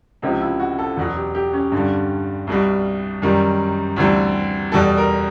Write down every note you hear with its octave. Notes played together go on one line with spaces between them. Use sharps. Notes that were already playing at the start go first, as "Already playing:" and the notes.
C#2 C3 F3 D#4
E4
F#4
A4
E2 B2 F#3 F#4
G4
G4
C#4
G2 D3 G3
C2 B2 G3
F#2 D#3 G3
D2 C3 E3 G3
E2 B2 G3 A4
A#4